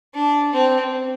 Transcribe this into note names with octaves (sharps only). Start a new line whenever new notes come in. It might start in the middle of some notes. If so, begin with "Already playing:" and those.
D4
C4